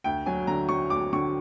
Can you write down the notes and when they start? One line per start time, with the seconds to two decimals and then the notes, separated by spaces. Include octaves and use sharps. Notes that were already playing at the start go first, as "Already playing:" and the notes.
0.04 D2 G5
0.26 F#3 G#5
0.47 D3 A#5
0.69 F#3 C#6
0.90 D2 D6
1.13 D3 C#6